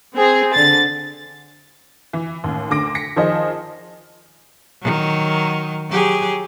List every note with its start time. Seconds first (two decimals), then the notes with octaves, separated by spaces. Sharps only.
0.14 C4 G#4
0.53 D3 A6
2.13 E3
2.44 A1 D#2
2.70 D2 D3 D6 A#6 D7
2.95 A#6 B6 C#7
3.16 D#3 F3 F4 G#4 C5 D#5
4.82 D#3 F#3
5.90 F#3 G4 G#4